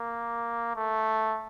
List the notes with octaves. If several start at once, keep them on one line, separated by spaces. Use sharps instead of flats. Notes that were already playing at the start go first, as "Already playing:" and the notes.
Already playing: A#3
A3